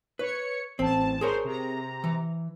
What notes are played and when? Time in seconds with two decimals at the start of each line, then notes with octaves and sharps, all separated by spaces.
0.19 B4 C#5 C#7
0.79 A1 C4 A5
1.21 G#4 A#4 C5 C#5
1.44 C3 A#5
2.04 E3